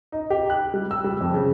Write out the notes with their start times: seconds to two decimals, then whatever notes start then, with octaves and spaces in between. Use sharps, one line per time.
0.12 D#4
0.30 G4
0.50 F#6
0.74 G3
0.91 E6
1.04 G3
1.21 F2
1.34 C#3